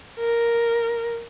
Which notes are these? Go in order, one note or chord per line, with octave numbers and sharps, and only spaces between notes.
A#4